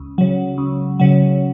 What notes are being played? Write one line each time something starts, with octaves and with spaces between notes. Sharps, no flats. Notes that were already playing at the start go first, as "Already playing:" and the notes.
Already playing: C#2
C#3 F#3
C#2
C#3 F#3